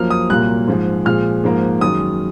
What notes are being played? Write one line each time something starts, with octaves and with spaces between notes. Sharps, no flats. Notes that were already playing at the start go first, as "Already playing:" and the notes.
Already playing: F#2 F3 A#3 F6
D#6
C2 A#2 F#3 A#3 F#6
G#2 F3 G#3
A#2 F3 G#3 F6
G#2 F3 A#3
F#2 D#3 G#3 D#6